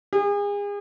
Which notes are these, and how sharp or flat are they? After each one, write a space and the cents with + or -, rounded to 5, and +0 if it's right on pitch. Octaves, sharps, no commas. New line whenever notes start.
G#4 -35